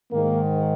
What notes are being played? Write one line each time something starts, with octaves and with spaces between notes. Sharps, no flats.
G#2 D#3 A#3